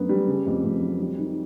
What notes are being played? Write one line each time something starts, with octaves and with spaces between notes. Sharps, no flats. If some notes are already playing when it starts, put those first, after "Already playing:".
Already playing: F#2 D3 B3
G3
C#3
F2
F2
F#3
G3
D#3